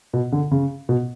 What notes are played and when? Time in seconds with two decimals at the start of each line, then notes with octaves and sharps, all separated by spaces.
0.13 B2
0.32 D3
0.51 C#3
0.89 B2